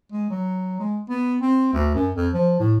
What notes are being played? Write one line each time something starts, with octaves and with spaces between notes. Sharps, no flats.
G#3
F#3
G#3
B3
C4
D2
F#2
F2
F3
A2